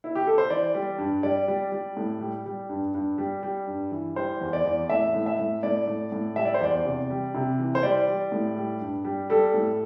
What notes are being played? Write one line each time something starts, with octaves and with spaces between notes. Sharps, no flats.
E4
G4
A4
C5
E3 D5
G3
G2
G3 D5
G3
G3
A2
G3
G3
G2
G2
G3
G3
G2
E3
G3 C5
E2
D5
E2
A2 E5
A2
E5
A2
A2 D5
A2
A2
G3 E5
D5
C5
E2 D5
C3
G3
C3
E3
C5
G3 D5
G3
A2
G3
G2
G3
G3 A4
A2